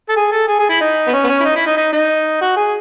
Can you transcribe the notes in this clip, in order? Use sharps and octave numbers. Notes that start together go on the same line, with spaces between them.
A4
G#4
A4
G#4
G#4
E4
D#4
B3
C#4
B3
C#4
E4
D#4
E4
D#4
D#4
D#4
F#4
G#4